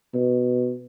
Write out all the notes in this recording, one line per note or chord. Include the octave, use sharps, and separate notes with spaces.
B2